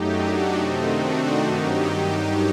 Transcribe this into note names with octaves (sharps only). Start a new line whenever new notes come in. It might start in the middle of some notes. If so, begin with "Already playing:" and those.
Already playing: F#2 F#3 A3 D#4 G4
D4 F#4
C3 D#3 A3 C4 D#4
D4 F#4
G2 D#3 F#3 D#4 G4